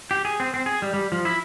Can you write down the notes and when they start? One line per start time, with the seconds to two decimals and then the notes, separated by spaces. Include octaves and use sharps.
0.11 G4
0.25 G#4
0.40 C4
0.54 C4
0.66 G#4
0.82 G3
0.94 G3
1.12 F3
1.25 E4